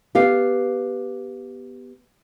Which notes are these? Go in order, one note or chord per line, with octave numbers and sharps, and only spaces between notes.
B3 G4 F5